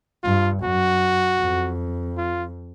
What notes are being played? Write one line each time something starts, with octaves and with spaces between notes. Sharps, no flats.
G2 F4
F#2 F#4
F2
F4